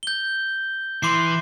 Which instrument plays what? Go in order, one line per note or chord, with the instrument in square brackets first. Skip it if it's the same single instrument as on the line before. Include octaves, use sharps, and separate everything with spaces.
[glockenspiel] G6 G7
[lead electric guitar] E3 [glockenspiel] C6 D6 C7